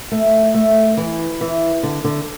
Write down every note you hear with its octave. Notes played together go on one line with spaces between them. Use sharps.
A3
A3
E3
E3
D3
D3